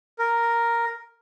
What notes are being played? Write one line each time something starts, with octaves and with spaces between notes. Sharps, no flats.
A#4